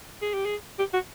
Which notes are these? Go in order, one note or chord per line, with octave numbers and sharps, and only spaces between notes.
G#4
G4
G#4
G4
F#4